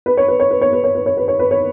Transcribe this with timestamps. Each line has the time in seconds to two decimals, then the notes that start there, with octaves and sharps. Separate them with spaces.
0.06 B4
0.17 C#5
0.28 B4
0.40 C#5
0.51 B4
0.61 C#5
0.73 B4
0.84 C#5
0.95 B4
1.06 C#5
1.17 B4
1.28 C#5
1.39 B4
1.51 C#5